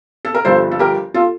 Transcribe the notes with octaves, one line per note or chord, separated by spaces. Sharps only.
A4
A#4
G1 G2 F3 A4 C5
A4
G4 A#4
F4 A4